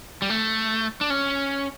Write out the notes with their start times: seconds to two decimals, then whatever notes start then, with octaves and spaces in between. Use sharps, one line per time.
0.22 G3
0.30 A3
1.01 D4
1.10 C#4